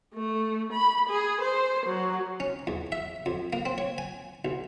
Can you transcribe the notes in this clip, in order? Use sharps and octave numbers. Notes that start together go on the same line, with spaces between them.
A3
B5
G#4
C5
F#3
C#4
E2
E5
F2
A#3
C4
C#5
G#5
B1